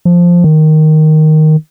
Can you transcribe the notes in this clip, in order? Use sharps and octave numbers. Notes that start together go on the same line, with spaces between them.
F3
D#3